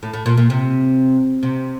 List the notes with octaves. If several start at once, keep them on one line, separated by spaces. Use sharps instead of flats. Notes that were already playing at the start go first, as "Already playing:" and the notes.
A2
A2
A#2
A#2
C3
C3